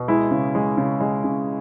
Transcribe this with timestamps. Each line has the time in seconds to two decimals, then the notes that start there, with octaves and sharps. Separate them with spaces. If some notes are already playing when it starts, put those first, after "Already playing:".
Already playing: B2
0.08 G#3 E4
0.31 C#3
0.55 G#3
0.77 C#3
1.00 G#3
1.24 C#3